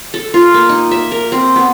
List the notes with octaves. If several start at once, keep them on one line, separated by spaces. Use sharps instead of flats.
A4
F4
A#3
D#4
E5
A#4
C4
B3